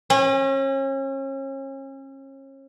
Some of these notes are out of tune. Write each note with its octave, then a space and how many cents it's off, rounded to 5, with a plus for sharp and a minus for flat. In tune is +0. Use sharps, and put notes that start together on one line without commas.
C#4 -35